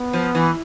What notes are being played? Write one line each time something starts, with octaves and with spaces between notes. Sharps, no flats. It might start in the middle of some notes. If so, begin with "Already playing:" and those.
Already playing: B3
F3
E3